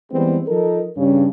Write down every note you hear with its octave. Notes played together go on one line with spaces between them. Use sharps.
E3 G3 G#3 B3 C4
F3 D#4 A4 A#4
G2 C#3